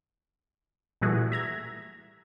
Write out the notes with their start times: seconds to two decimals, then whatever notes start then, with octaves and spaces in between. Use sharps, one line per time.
1.02 A#2 E3 G3 A3 F#4 G#4
1.32 E5 A#5 G#6